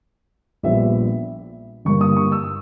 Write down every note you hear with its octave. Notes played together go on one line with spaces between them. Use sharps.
A#1 A#2 G3 B3 E5
G1 G2 G3 A#3 C#6
D#6
C#6
E6